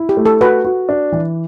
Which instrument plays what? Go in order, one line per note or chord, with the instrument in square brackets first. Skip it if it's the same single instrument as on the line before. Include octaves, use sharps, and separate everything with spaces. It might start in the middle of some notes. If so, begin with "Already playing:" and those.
Already playing: [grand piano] E4
[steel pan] G4
[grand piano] A3
[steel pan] A4
[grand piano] F#4 [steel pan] B4
[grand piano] F#4
D4
E3